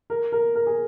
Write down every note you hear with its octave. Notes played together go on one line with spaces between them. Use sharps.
A#4
A#4
A#4
G#4